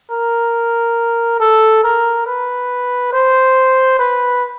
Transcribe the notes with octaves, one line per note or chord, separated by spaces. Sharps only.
A#4
A4
A#4
B4
C5
B4